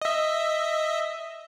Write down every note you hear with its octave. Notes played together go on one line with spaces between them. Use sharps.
D#5 E5